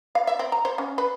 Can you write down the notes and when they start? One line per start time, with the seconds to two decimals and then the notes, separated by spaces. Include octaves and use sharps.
0.15 F5
0.27 E5
0.39 C4
0.52 A#5
0.65 C5
0.78 C#4
0.98 B4